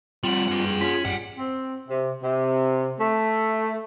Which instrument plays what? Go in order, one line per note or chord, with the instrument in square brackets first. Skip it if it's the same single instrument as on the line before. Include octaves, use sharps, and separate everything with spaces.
[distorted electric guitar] G3 F#4 [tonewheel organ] C4 F4 [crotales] F#7
[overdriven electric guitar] G2 [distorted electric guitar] G#4 F#5
[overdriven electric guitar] C#4 [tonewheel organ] F4 [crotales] B6
[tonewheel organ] G2 [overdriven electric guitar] G3 [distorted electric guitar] F5 F#5
[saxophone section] C4
C3
C3
A3